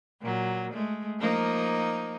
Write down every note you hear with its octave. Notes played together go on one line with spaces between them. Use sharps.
A#2 F#3
G#3 A3
F3 A#3 D#4